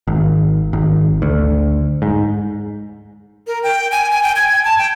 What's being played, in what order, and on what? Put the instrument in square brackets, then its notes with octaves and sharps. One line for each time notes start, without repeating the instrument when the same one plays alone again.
[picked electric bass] G#1
G#1
D2
G#2
[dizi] A#4
G5
G#5
G#5
G5
G#6
G#6
A5
G5